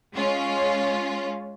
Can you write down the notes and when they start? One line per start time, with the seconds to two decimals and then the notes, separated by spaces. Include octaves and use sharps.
0.13 G#3 C#4 F4